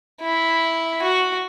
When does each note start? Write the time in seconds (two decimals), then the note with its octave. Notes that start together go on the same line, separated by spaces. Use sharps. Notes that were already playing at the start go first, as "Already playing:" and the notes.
0.21 E4
1.02 F#4